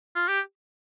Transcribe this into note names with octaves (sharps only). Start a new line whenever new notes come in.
F4
G4